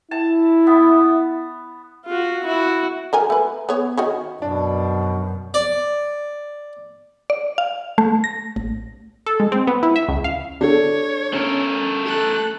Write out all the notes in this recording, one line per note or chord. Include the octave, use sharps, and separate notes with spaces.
E4 A5
B3
F4 F#4
E4 F#4
F#3 A#4 G#5
A3 B4
B3 C#5
D#3 F#4 C#5
F#2 B2 D4
D5
D5
F5
A3
A#6
A1
A4
G#3
C4
B3
E4
E5
C#2
F5
D4 A4 C#5
A3 C#4 A#4
A4 F#6